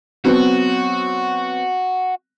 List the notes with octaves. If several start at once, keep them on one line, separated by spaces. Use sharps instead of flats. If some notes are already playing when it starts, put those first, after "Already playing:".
F#3 B3 C4 F#4